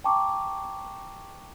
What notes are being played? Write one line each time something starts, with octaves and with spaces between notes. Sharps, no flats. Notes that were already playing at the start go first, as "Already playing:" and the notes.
G5 A5 A#5 C#6 D6